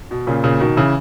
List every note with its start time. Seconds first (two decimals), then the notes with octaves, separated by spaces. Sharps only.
0.11 B2
0.27 A#2 C#3
0.44 A#2 C#3
0.60 B2 D#3
0.76 C#3 E3